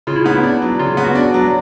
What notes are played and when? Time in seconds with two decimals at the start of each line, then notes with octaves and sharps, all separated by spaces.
0.07 C#3 F4
0.16 E4
0.24 B3 D#4
0.33 E4
0.44 D4
0.62 F#3
0.79 C#3 F4
0.97 B3
1.04 F#4
1.15 D4
1.34 F#3